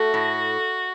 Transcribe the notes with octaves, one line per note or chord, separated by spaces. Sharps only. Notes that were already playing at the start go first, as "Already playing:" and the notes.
Already playing: A3 F#4
A2